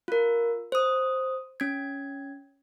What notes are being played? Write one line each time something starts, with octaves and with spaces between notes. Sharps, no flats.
F4 A#4
C5 D#6
C#4 G#6